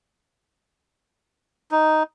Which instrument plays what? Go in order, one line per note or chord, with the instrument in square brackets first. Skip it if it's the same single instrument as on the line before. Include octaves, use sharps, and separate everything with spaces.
[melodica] D#4